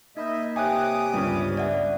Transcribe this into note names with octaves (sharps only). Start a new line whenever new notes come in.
A#3 D#4 D#5 E5 B5 G6
C3 C#5 E5 G5 G#5 D6 D#6 F#6
G1 C#2 G3 C#4 D4 F4 B4
D5 E5 F#5